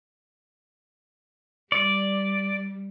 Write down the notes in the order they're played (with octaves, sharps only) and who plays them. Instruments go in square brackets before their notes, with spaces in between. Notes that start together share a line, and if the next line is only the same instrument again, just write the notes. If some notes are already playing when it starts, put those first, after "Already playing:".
[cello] G3 [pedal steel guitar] D5